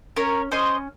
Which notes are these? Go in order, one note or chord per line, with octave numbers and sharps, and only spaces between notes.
C#4 A#4 C#5
C#4 C5 D#5